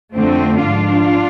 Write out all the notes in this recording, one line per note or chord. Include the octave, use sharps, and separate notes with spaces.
F2 D3 F3 A3 C4
G#2 F3 D4 F4